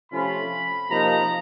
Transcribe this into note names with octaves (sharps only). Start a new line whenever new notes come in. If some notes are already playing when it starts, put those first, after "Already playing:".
C3 F3 A3 C#4 F4 B5
C3 F3 A#3 D#4 A#5